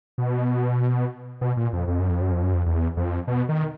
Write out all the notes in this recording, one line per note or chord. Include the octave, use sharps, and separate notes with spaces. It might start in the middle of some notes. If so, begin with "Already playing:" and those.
B2
B2
A#2
F2
F2
F#2
F2
F#2
F2
F#2
F2
E2
F2
B2
D#3